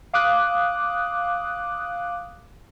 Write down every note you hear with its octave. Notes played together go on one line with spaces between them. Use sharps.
F5 D6 D#6 F#6